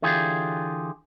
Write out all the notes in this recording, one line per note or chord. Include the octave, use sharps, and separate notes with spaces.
D3 E3 F4 G4 G#4